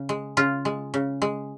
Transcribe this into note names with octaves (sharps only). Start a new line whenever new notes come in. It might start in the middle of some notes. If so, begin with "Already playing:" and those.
Already playing: C#3
G#3
C#3 F4
G#3
C#3
G#3